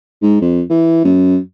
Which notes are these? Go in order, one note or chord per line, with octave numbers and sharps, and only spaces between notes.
G#2
F2
E3
F#2